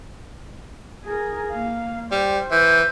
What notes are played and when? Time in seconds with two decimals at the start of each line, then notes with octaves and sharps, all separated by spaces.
1.04 G#4 A#4
1.51 A#3 F5
2.11 G3 C5
2.51 E3 G6